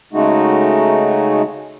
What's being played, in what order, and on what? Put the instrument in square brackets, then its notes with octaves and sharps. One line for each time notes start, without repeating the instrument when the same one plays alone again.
[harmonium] C#3 G#3 A3 D#4 F#4